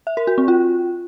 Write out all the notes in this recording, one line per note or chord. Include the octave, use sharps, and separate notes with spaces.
E5
A#4
F#4
C4
F4